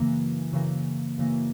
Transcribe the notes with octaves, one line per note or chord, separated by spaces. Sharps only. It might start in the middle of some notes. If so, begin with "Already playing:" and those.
Already playing: F#2 C#3 E3 A#3
F#2 C#3 E3 A#3
F#2 C#3 E3 A#3